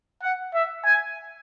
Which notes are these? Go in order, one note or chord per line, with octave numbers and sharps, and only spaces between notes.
F#5
E5
G#5